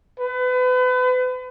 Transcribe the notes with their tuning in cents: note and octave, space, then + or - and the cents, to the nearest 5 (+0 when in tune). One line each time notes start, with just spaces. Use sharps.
B4 +35